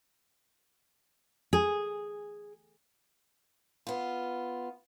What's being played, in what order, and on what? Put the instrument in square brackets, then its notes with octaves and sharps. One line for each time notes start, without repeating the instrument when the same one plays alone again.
[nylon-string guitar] G#4
[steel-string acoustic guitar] B3 F4